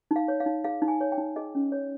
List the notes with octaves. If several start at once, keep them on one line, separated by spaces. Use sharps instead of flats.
D#4
F5
C#5
F5
D#4
G#4 F5
D#4
G#5
C#5
G5
D#4
G#4 D#5
C#4
C#5